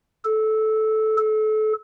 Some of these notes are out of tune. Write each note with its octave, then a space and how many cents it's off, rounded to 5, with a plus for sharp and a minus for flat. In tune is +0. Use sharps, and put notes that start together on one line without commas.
A4 -15
A4 -30